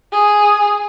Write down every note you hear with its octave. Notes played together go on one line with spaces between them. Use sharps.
G#4